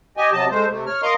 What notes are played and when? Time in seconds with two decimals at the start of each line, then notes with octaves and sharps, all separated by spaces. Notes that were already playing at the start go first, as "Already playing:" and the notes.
0.17 G4 D#5 G#5
0.33 C3 F#3 D#5 A5
0.51 G#3 A3 C5
0.69 C3 A3
0.87 C#5 F6
1.02 A#4 D#5 F5 A#5 C6